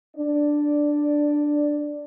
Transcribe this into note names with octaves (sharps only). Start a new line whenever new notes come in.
D4 D5